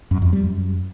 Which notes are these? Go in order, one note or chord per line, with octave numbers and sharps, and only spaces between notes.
F#2
F2
G3
F#2